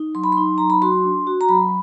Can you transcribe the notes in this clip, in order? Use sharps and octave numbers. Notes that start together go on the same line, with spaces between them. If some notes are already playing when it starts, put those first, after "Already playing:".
Already playing: D#4
F#3 C6
B5
D#4 C6
F#3 A#5
B5
F#4 C6
D4
F#4
A#5
F#3 B5